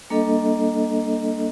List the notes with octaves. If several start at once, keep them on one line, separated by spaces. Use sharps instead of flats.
G3 A#3 D4 A4 D#5